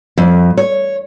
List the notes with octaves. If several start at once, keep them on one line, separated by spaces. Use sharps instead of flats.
F2
C#5